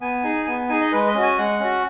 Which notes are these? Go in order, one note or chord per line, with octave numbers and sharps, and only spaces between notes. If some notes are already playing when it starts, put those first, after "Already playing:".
B3 G#5
D#4 G#4
B3 G#5
D#4 G#4 G#5
D#5
G#3 B4
D#5
C#4 F#4
G#5
G#3 F#5
C#4 F#4